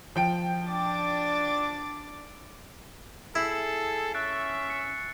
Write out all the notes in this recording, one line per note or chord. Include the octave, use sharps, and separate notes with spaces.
F3 G5 D7
D4 D6 A6
E4 G#4 A4 E6 C7
C#4 E5 F#6 A6 D7
C#7